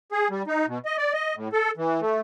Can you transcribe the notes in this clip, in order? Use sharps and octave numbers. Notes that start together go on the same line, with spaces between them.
G#4
G3
D#4
B2
D#5
D5
D#5
A2
A4
E3
A3